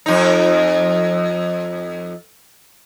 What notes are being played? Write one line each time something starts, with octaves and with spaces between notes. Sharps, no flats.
F2 D#4